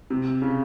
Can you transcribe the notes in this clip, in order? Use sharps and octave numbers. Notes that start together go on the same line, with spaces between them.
C3
C#3